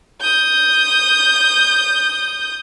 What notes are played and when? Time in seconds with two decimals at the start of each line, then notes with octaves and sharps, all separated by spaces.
0.21 D#6 G6